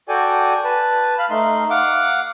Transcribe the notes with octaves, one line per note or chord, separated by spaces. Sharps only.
F#4 A4 D5 G5 G#5
B4 A5
F5 B5
A3 D#4 C6
F5 F#5 D6